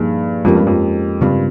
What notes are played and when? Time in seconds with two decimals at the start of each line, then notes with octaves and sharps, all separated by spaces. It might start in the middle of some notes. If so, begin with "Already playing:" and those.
Already playing: G2 F3 A#3 D#4 G#4
0.45 F2 G#3 C#4 G4 A#4
0.55 G2
0.67 F2
1.21 G2 C#3 G3 C4 F4